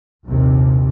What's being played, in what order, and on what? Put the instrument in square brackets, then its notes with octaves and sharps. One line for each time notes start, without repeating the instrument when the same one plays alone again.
[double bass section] A#1 D#2 C3